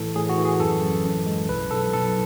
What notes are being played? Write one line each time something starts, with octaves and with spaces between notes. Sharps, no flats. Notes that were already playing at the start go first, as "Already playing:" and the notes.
Already playing: A2 E3 A4
A2 G#4
F#4
E3
G#4
F#2 A4
F#2
F#2
G#3
B1 B4
B1 A4
B1 A4